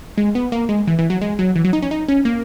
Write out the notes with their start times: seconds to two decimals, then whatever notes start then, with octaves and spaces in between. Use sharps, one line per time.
0.18 G#3
0.35 B3
0.52 A#3
0.69 G#3
0.87 E3
0.99 E3
1.10 F#3
1.22 G#3
1.39 F#3
1.56 E3
1.65 F#3
1.73 D#4
1.82 C#4
1.91 D#4
2.08 C#4
2.25 A#3